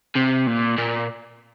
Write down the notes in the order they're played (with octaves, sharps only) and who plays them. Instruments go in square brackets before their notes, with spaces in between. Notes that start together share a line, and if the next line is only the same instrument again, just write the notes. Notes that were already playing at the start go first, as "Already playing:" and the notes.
[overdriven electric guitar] C3
A#2
A#2